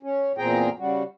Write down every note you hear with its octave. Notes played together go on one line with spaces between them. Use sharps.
C#4
E2 A#2 C4 G#4 G5 A#5
C#3 G3 F#4